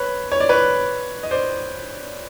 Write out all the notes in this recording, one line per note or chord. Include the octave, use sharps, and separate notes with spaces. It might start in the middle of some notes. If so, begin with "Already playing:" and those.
Already playing: B4 C#5
C#5
D5
B4 C#5
D#5
C5 D5